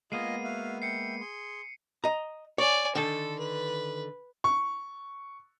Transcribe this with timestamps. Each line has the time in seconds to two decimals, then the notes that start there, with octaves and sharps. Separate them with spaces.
0.12 G#3 A#3 B3 F4 G#4 D#5 C7 D#7
0.44 F#4 E5 F5
0.82 E5 G5 C7 C#7
1.21 G#4 C6
2.04 D#5 A#5
2.58 C#5 D5 G#5
2.95 D3 D#3 A4
3.39 B4
4.44 C#6